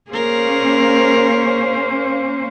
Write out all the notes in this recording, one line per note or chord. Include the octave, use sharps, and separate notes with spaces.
A#3 C#4 G#4 A#4 C5